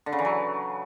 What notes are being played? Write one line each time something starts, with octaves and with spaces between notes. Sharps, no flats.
D3
C#3
E3
F#3